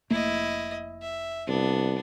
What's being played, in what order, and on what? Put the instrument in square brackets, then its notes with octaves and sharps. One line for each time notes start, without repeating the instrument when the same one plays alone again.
[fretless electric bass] F1 A3 A#3 [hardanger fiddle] E4 D#5
[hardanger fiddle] E5
[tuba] C2 [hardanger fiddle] B3 D4